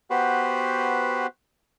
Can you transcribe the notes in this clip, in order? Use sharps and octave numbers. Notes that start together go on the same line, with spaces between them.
B3 F#4 G4 B4 C5